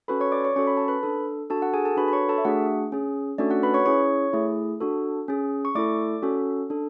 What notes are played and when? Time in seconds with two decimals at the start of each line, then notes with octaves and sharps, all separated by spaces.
0.08 C#4 F#4 A4 B4 B5
0.20 C#5 C#6
0.32 D5 D6
0.44 C#5 C#6
0.56 C#4 F#4 A4 C#6
0.67 B5
0.77 A5
0.88 B4 B5
1.03 D4 A4
1.50 D4 F#4 A4 A5
1.62 F#4 F#5
1.74 G#4 G#5
1.85 A4 A5
1.97 D4 F#4 A4 B4 B5
2.08 B5
2.13 C#5 C#6
2.29 A4 A5
2.38 E5
2.45 A3 D4 F#4 G#4 F#5
2.92 C#4 G#4
3.38 A3 C#4 D4 F#4 A4 D5
3.51 F#4 F#5
3.63 B4 B5
3.74 C#5 C#6
3.86 C#4 E4 G#4 C#5 C#6
4.33 A3 E4 G#4
4.81 D4 F#4 A4
5.28 C#4 G#4
5.65 C#6
5.75 A3 E4 A4 D5 D6
6.23 C#4 F#4 A4
6.70 D4 A4